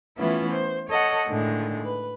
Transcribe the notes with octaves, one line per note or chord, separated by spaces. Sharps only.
E3 A3 B3 C#4 E4 F4
C5
A4 C#5 D#5 F#5
A2 D3 D#3 G#3
B4